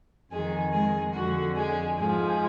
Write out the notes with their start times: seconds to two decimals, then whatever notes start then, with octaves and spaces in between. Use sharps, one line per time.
0.31 F2 D#3 G#3 G#4
0.73 G#3 G#4
1.14 F2 D3 F3 F#4
1.56 G#3 G#4
1.97 G#2 F3 G#3 G#4